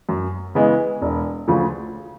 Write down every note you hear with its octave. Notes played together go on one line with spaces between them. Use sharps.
F#2
C#3 E3 G#3 B3
E1
D2 C#3 F3